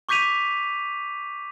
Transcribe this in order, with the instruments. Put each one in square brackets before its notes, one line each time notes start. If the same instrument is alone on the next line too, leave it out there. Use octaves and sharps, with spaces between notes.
[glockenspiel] C#6 D6 G6 B6 D#7 F7